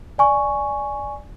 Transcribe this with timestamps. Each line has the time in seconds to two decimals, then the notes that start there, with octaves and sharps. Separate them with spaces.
0.18 D5 G#5 C#6